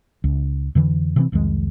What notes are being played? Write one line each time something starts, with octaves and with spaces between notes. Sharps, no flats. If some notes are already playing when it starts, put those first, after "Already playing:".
C#2
F2 D3 E3
C3 E3 C4
C2 F2 D#3 G#3